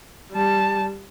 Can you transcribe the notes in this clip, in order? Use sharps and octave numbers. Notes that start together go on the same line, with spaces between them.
G3 A5